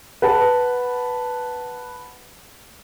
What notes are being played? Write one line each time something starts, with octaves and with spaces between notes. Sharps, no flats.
B4 F#5 A5